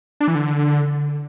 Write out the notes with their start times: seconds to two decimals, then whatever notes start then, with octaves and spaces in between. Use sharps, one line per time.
0.20 D4
0.28 E3
0.35 D3